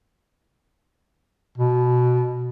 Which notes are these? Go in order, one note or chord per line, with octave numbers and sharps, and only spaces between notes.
B2